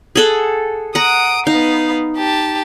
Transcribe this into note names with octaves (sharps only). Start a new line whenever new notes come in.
G#4 A4 F#5
F#5 A#5 D#6 D7
B3 D#4 F5
G4 A5